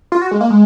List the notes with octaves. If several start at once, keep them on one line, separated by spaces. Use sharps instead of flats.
F4
F#4
G#3
A#3
G#3